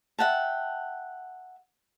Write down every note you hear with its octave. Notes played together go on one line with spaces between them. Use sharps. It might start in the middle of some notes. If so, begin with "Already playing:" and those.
E5 F#5 G5 A5